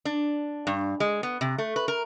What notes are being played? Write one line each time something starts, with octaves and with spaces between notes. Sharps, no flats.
D4
G2
G#3
B3
C3
A3
B4
A#4